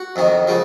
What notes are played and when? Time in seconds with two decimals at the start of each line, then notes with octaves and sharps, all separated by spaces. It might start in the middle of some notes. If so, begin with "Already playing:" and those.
Already playing: F#4
0.16 F2 D#3
0.48 C#3 F3